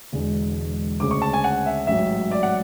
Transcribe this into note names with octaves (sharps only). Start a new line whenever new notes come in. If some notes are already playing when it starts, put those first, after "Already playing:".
E1 E2 D3 G#3
D2 C#3 G#3 D6
C#6
A5
G#5
F#5
E5
A1 G#2 F#3 E5
D5
F#5